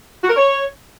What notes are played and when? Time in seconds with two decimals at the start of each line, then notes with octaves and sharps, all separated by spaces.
0.23 F#4
0.29 A#4
0.35 C#5